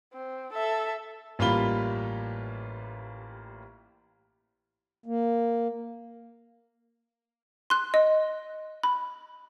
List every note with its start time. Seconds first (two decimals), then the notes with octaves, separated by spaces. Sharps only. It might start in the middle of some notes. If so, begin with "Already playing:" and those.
0.13 C4
0.53 A4 E5
1.39 A1 G3 A#3 F4 B5 G7
5.06 A#3
7.70 C6 F#6
7.94 D#5
8.83 B5